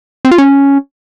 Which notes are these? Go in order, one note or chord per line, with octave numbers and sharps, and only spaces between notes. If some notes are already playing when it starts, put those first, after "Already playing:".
C4
F4
C#4